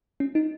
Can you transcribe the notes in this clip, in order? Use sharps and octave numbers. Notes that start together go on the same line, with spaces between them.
C#4
D#4